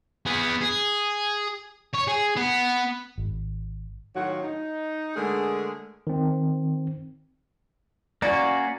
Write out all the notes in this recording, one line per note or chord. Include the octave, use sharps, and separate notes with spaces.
B3 G#4
G#4
C#5
G#4
B3
G#1
A2 D#3 F#3 F4 F#4
D#4
D3 G#3 A3 D4 G#4 A#4
D#3 C4
A#3 C#4 F#4 D5